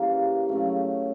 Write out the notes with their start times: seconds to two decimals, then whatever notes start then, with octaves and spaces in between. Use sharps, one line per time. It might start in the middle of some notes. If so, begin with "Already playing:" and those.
Already playing: C#3 E3 G3 A#3 F5
0.49 C#3 F#3 A3